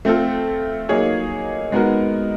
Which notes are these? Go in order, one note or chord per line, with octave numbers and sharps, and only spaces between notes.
A3 C4 F4 A4
F#3 A#3 D#4 G#4 C#5
G#3 B3 D#4 F#4 A#4